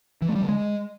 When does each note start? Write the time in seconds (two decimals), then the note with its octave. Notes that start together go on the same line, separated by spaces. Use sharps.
0.22 E3
0.29 A3
0.35 G3
0.42 D3
0.49 G#3